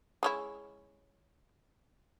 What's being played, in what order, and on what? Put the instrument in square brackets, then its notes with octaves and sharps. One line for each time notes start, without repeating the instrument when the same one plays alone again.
[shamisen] G#3 C#4 E4